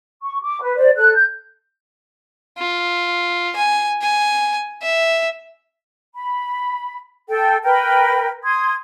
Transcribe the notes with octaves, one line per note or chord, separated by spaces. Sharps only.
C#6
D6
B4
C5 D5
A4 F#6
G6
F4
G#5
G#5
E5
B5
A4 G5
A#4 B4 G5
C6 D#6 G#6